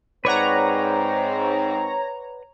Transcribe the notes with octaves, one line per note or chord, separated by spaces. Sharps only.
G#2 C4 B4 C#5 D5 F#5 A#5